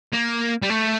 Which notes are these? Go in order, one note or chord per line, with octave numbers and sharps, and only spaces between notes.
A#3
G3
A3